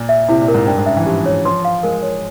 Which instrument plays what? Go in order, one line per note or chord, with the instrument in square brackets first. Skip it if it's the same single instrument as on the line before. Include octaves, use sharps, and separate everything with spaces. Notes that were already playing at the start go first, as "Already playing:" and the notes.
Already playing: [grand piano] A#2
[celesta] E5
[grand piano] C3 [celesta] E4
[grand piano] A#2
[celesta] A#4
[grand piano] G#2
[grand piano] G2 [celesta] G5
[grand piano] G#2
[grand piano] C#3 [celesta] E5
[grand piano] E3
[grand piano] F3 [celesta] G4
[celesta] C#5
[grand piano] F3 [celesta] C6
[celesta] F5
[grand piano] G#3 [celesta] A#4
[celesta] C#5